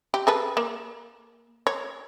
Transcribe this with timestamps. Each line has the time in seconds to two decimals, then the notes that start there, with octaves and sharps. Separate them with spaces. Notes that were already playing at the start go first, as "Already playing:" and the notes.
0.14 G4
0.27 G#4 A4 B4
0.57 A#3
1.67 C#5